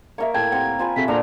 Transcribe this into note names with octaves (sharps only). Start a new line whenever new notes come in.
A#3 A#4 C#5 D#5 E5
A2 G5 A5 G#6
C4 G4 A#4 F#5
F4 C5 G#5 B5
C3 F#4 A4 E5 B6
A#2 D4 F#4 A4 C5 A#5